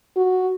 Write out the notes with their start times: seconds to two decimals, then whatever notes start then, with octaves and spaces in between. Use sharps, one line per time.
0.17 F#4